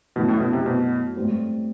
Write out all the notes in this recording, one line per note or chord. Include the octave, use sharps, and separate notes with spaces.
F#2 B2 E3 A3 E4
A2
B2
C3
B2
A2 G3 C4